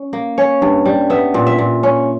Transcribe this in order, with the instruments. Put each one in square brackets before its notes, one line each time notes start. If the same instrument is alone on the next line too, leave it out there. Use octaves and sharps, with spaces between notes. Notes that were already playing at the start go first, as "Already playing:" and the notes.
Already playing: [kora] C#4
A#3
C#4 C#5
G2
G3
B3 E5
A#2
E5
A#2
C#4